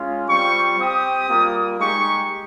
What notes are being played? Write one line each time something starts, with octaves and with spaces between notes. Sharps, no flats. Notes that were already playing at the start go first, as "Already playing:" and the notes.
Already playing: G#3 C#4 F4
G3 C4 F4 C#6
C4 G4 D#6
G3 A#3 F4
G#3 D#4 G4 C#6